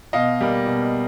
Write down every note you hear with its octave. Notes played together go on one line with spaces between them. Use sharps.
B2 D#5 F5
G3 A#3
B2